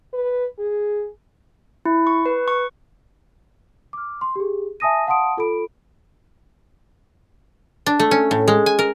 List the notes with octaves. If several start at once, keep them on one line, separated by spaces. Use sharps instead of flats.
B4
G#4
E4
C#6
B4
C#6
D6 F6
C6
G4 G#4
E5 G#5 A5 D#6 A#6 D#7
F5 F#5 A5 C6 D#6 D7
F4 A4 B5 D7
D4
A3
C#4
A2
G#3
G#5
A#4